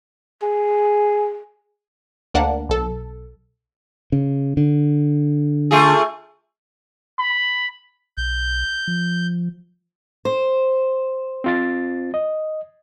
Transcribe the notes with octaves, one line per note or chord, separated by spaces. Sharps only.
G#4
D2 A#3 D4 F#5
B1 A4
C#3
D3
A3 F4 G#4
B5
B1 G6
F3
C5
C4 F4 A6
D#5